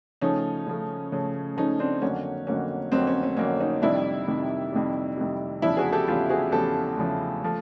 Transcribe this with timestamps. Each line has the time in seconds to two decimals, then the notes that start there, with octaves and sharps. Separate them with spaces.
0.21 C#3 F3 A3 C#4 D#4
0.67 C#3 F3 A3
1.12 C#3 F3 A3
1.57 C#3 F3 A3 C#4 D#4
1.79 C4 D4
2.02 F2 D3 F#3 A#3 C#4
2.47 F2 D3 F#3 A#3 C#4
2.92 F2 D3 F#3 A#3 C4
3.07 C#4
3.23 C#4
3.37 F2 D3 F#3 A#3 C#4
3.60 C#4 D#4
3.82 F2 C3 D#3 G3 D4 E4
4.27 F2 C3 D#3 G3
4.72 F2 C3 D#3 G3
5.17 F2 C3 D#3 G3
5.62 E2 C#3 F3 D4 E4
5.77 F#4 G#4
5.93 G4 A4
6.08 E2 C#3 F3 F4 G4
6.30 F#4 G#4
6.52 E2 C#3 F3 G4 A4
6.97 E2 C#3 F3
7.44 F3 A3